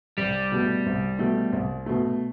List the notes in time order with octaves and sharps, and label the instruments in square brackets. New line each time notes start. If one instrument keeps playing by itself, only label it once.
[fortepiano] C2 [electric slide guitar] G3
[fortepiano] B2 A3
C2
B2 A3
C2
B2 A3